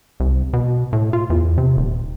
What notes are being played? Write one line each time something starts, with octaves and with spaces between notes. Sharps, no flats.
C2
B2
A2
F4
E2
C3
D#1